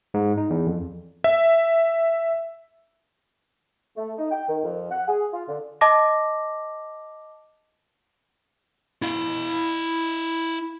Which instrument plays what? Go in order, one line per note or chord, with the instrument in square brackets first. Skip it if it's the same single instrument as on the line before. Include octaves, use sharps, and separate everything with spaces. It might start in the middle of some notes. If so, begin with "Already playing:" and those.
[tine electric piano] G#2
D#4
E2
F2
[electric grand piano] E5
[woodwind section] A3
D#4
G5
D#3
F2
F#5
G#4
F4
D3
[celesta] D#5 A5 D6 A#6
[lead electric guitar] E4 F5